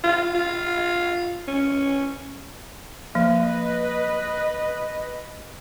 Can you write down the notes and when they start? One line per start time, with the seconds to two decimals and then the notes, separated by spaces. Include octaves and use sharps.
0.04 F4
0.35 F4
1.48 C#4
3.15 F3 A#3 B4 D#5